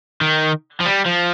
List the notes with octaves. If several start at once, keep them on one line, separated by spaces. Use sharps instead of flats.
D#3
F3
G3
F3